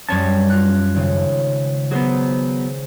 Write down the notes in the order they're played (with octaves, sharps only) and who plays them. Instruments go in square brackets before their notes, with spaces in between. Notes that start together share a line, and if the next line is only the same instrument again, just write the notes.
[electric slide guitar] F#2 C#5 A5 [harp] G3 C#4
[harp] F4 F#6
G#1 C#3
[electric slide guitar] F#3 B3 [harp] G#4 C5